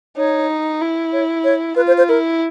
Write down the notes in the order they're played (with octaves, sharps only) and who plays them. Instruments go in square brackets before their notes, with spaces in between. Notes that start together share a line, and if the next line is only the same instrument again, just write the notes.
[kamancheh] D#4 [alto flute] C#5
[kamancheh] E4
[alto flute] C#5
C#5
[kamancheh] F4 [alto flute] B4
[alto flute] C5
C5
[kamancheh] E4 [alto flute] A#4